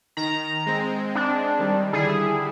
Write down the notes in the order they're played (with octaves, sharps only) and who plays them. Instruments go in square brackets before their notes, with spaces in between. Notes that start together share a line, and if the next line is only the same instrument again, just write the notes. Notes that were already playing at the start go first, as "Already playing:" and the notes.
[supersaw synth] D#3 [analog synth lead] A#5
[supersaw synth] G#3 C4
[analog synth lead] D4
[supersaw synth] D#3 G3
[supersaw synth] D3 G3 E4 [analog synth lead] G#4